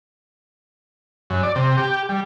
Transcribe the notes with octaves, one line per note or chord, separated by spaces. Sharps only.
F#2
D5
C3
G4
G3